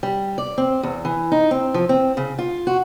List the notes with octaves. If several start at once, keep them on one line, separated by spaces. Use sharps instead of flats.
G3
D5
C4
E2
E3
D#4
C4
F3
C4
C#3
F4
F#4